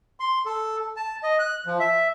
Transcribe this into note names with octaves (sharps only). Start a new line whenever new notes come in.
C6
A4
A5
D#5
F#6
F3
E5